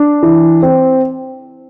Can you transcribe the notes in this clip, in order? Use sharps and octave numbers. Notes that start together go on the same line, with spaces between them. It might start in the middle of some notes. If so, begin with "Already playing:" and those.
Already playing: D4
E3
C4